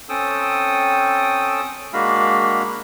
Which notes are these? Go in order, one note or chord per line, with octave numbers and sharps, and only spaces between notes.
C4 C#4 A4 G5 D#6 E6
G#3 A#3 D4 F#4 F5 B5